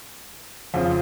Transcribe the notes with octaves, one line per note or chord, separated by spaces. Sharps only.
F2 C#3 F3 C4